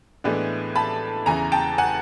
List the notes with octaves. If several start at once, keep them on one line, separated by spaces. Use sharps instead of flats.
A2 E3 G#3 B3 D4
A5 B5
E2 C#3 E3 G#5 A#5
G5 A5
F#5 G#5